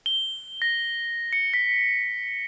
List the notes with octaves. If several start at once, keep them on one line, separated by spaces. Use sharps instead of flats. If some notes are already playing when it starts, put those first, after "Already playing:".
G7
A#6
C#7
B6